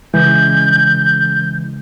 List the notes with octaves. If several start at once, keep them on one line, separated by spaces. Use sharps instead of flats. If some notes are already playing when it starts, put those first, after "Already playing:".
C#3 E3 G#3 G6